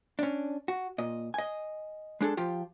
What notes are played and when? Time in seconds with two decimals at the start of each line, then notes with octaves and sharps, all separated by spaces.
0.19 C#4 D4
0.68 F#4
0.98 A#2 D#5
1.34 D#5 G#5
2.21 G#3 D4 G#4 A4
2.37 F3 F4 G4